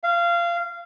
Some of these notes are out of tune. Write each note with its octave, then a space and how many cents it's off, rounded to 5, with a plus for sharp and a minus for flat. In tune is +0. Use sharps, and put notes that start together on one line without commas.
F5 -20